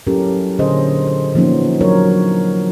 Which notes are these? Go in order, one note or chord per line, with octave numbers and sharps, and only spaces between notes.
F#3 C#4 E4 G4 A4 A#4
A#2 D3 C#4 G#4 C5 D#5
C5
E3 F3 A#3 B3 C#4 D#4
F#3 D4 A#4 C#5